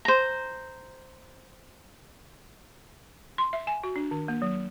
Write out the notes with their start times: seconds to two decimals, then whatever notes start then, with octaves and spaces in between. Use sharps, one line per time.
0.05 C5 A#5
3.38 C6
3.53 E5
3.67 G#5
3.84 F#4
3.96 D4
4.11 D#3
4.28 A#3
4.42 F#3